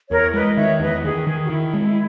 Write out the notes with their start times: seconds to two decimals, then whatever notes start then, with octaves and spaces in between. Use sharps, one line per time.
0.11 E2 A#4 C#5
0.34 G#3 B4 D#5
0.56 D#3 C#5 E5
0.80 E2 B4 D#5
1.03 D#3 G#4
1.27 D#3
1.45 F#4
1.50 D#3 E4
1.74 G#3